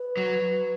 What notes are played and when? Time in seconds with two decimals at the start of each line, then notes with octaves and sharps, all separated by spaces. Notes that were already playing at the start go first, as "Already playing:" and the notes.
Already playing: B4
0.17 F#3